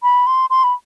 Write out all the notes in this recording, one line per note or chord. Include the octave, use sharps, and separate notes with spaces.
B5
C6
C6
B5